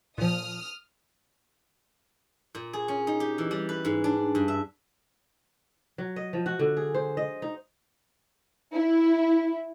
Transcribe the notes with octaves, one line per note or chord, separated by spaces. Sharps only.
A#2 F3 D#6 F6
A#2
G#4
C#4
D#4
G4
E3
G3
B4
G#2
D4
G2
E5
F#3
D#5
F3
F#4
D3
G#4
C5
D#5
D#4
E4